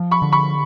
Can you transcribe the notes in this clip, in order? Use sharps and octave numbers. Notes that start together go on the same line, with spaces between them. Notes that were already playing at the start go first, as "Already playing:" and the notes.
Already playing: F3
B5 C#6
D3
B5 C#6